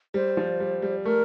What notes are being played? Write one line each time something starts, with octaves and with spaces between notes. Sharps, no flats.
G3 C5
F3
G3
G3
A3 A#4